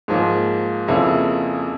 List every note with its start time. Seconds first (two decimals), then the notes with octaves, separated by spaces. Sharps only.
0.08 G#2 F3 A#3
0.88 F2 C#3 F3 A#3 E4